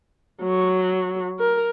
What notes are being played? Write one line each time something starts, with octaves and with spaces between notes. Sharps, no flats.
F#3
A#4